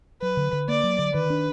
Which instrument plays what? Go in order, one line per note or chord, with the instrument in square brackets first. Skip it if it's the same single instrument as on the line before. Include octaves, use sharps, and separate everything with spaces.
[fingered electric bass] F#3 [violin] B4
[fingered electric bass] D3
D3
[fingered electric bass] A#3 [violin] D5
[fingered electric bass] F#3
D3
[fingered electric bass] D#3 [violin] B4
[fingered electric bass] D4